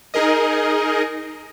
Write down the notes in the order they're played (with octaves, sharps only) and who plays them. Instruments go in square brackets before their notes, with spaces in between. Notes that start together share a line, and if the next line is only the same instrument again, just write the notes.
[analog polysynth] D#4 G#4 A#4 D#5